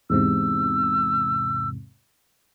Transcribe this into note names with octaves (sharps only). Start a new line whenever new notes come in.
E2 G#2 C3 E6